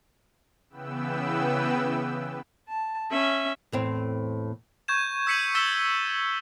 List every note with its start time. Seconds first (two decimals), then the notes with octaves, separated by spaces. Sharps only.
0.70 C#3 E3 B3 B4 G5 E6
2.69 A5
3.11 C#4 E5
3.72 E2 A2 C4
4.88 C#6 G6 G#6 E7
5.27 E6 G6 B6 C#7 D#7 F#7
5.55 E6 A6 B6 E7 G7